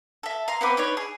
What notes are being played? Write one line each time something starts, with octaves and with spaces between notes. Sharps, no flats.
A4 E5
F5 A#5 C6
B3 C4 B4 D6
D4 D#4 B4 C#5
G#4